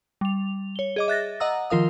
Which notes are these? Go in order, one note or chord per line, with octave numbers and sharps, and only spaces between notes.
G3 F7
C#5 G7
G#4 D#5 D6
E5 F#6 A6 A#6
D#5 F#5 A#5 D#6 E6
D#3 F3 F4 A#4 F5 D#6